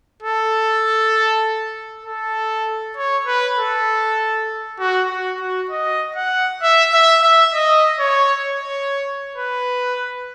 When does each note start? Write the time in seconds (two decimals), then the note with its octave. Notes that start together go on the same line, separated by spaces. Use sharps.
0.22 A4
2.05 A4
2.97 C#5
3.27 B4
3.57 A4
4.79 F#4
5.10 F#4
5.40 F#4
5.70 D#5
6.16 F#5
6.63 E5
6.93 E5
7.23 E5
7.54 D#5
8.00 C#5
8.45 C#5
9.36 B4